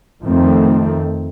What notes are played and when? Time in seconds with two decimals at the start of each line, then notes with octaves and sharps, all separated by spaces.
0.24 F2 D#3 A3 C4